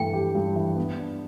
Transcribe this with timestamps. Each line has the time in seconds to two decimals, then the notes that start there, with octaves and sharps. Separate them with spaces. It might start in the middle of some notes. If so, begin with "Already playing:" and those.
Already playing: G2 E3 A3 G5
0.13 G4
0.35 G2
0.56 E3
0.77 B3
0.98 D4